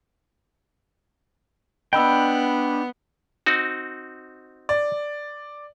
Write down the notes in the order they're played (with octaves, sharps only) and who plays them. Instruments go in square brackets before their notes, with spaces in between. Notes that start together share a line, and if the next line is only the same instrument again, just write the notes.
[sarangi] B3 [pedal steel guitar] D4 G5 [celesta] D#5 B5 E6
[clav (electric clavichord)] C4 D#4 F#4
[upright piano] D5